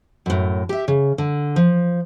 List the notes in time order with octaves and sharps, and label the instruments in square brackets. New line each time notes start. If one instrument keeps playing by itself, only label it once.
[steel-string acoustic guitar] F#2 A2
G4 E5
C#3
D3
F3